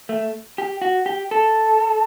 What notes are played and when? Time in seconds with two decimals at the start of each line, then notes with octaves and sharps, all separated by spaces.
0.09 A3
0.58 G4
0.82 F#4
1.06 G4
1.31 A4